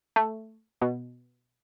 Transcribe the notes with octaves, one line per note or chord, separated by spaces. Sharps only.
A3
B2